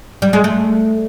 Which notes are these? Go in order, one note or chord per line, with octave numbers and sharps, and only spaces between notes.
G3
G#3
A3